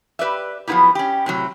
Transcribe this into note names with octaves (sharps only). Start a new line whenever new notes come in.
G4 B4 D5 E5
F3 F#3 B3 D#4 E4 G4
C#4 G4
A2 C3 F#3